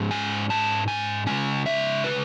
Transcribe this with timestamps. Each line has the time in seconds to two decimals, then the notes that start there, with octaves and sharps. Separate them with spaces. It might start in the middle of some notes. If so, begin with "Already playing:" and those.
Already playing: G#2 G#3 C#4
0.11 G#5
0.50 A5
0.88 G#5
1.27 C#3 G#3 C#4 G#5
1.66 E5
2.04 B4